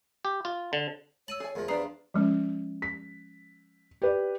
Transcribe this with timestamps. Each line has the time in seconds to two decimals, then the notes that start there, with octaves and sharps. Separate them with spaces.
0.25 G4
0.45 F4
0.73 D3
1.28 C#5 A5 E6 D#7 F#7
1.40 G#4 G#5
1.55 E2 F3 A#4
1.68 G3 D4 B4 D5 A#5 D#6 C7
2.14 F3 G#3 C#4
2.82 B6
4.02 G4 B4 D5